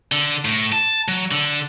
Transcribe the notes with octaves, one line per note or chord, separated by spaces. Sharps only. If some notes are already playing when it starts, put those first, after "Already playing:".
D3
A2
A5
F#3
D3